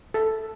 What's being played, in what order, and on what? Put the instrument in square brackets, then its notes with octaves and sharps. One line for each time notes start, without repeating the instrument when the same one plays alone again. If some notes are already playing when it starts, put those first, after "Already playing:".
[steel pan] A4